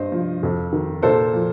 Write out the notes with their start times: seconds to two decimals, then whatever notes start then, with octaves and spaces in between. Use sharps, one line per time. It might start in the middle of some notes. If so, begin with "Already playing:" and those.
Already playing: G2 C5 D#5
0.12 F3
0.43 F2
0.72 D#3
1.02 A#2 A4 C5
1.34 F3